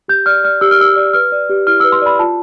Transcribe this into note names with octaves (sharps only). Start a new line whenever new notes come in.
G4 G6
D5 F6
D5 F6
G4 E6
F6
G4 E6
D5
B4 F6
D5
G4
E4 F6
B4 E6
C6
D5 B5
F4 A5